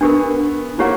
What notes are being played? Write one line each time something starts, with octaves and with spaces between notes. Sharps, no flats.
B3 D4 G4 A#4
A#3 E4 G4 C#5 F#5